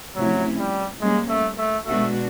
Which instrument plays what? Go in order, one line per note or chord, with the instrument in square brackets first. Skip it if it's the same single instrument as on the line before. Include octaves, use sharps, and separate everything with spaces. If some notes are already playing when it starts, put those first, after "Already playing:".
[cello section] C3 F3 A3 C#4 E4 [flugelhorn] F#3
[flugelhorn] G3
[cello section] G3 A#3 C#4 [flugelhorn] G#3
[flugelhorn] A3
A3
[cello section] B2 G#3 B3 D4 F#4 [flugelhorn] A3